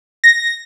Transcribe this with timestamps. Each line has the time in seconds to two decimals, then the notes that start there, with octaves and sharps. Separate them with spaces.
0.24 A#6